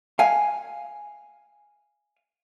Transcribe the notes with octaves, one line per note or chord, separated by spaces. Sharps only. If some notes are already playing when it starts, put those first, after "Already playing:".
F5 G#5